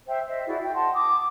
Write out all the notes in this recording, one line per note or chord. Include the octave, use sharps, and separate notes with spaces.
C5 E5 G5
C5 D#5 E5
E4 F#4 G#4 D5
G5
D#5 F#5 A5 C6
D6 D#6